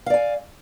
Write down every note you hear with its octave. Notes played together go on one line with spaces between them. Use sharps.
D5 F5 G#5